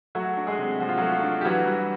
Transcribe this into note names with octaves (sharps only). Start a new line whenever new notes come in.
F#3 A3 F#4
D4
G#3 G#4
C3
F3 F#4
F4
F#3 A3 F#4
F4
D4
G4
E3 F#3 F#4
G3